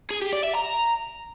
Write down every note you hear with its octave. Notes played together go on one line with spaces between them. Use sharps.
G#4
G4
D5
E5
A#5